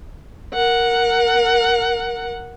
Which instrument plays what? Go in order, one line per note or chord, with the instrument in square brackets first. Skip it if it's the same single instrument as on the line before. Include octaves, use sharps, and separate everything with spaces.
[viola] A#4 F#5